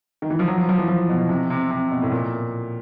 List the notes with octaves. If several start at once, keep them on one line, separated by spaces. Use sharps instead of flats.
D#3
E3
F3
F#3
F3
F3
E3
F3
B2
C3
C3
C3
B2
A2
A#2